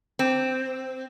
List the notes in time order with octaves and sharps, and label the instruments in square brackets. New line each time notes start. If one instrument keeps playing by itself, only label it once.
[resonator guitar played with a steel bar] C4